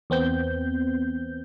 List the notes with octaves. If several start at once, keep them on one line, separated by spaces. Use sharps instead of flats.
E2 B3 C4 G6